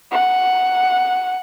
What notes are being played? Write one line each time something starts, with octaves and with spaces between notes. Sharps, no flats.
F#5